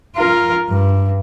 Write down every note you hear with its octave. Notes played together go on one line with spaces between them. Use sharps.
F4 A#4
G2